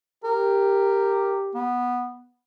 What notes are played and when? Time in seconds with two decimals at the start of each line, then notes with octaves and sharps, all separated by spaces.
0.24 G4 A#4
1.54 B3